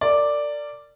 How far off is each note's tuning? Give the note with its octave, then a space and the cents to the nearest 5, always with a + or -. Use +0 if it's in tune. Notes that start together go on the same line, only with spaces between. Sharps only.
A#4 -35 D5 +0